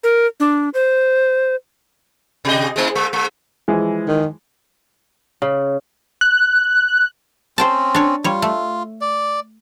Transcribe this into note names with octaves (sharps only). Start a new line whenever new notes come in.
A#4
D4
C5
C3 G4 D#5
G#3 A#3 E4
G#3
G#3
E3 F3 G#3
D#3
C#3
F#6
C4 C#4 C5 G5 A5
D4 C#5
G3 F4 C#5
A3
D5